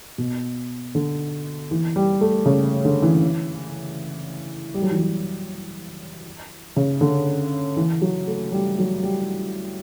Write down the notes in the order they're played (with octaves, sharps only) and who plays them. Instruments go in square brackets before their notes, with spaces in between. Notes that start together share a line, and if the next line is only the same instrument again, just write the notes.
[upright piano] B2
D3
E3
G3
A3
C#3
D3
E3
G3
F#3
E3
F#3
C#3
D3
E3
F#3
A3
G3
F#3
G3